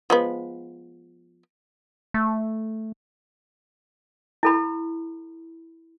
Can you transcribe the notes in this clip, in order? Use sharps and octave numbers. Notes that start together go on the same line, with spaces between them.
F3 G#3 B3
A3
E4 A4 B5